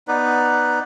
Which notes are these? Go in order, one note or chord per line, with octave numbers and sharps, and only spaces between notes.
B3 D#4 B4 D5